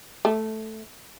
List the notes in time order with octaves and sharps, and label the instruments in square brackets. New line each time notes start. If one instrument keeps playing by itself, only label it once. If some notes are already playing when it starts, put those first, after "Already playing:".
[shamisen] A3